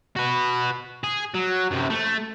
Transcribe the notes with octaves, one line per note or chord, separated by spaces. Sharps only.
F#4 B4
G#4
F#3
F#2 C3
A3